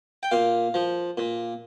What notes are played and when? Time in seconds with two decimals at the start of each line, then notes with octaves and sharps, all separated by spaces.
0.23 G5
0.31 A#2 F5
0.74 F3
1.17 A#2